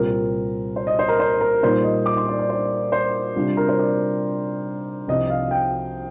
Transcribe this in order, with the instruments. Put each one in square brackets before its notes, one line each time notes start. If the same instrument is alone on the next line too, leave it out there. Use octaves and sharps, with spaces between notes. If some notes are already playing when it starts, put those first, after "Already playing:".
Already playing: [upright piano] C2 A#2 G3 C4 F4 A#4
C5
D#5
C5
A#4
C5
A#4
A#2 G3 A#3 D#4 C5
D#5
D6
C6
D5
D5
C5
C5
C3 G3 D4 F4
A#4
C5
D5
C2 C3 F3 C4 F4 D#5
F5
G5